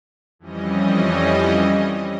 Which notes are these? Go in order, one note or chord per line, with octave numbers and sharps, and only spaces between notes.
F2 E3 G3 C#4 D#5